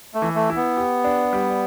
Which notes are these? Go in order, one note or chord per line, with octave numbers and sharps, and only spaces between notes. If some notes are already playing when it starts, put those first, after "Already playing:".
A3
E3
A3
E4
B3
G4
D4
G3